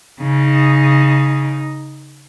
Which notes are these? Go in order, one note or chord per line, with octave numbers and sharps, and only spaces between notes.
C#3 D#4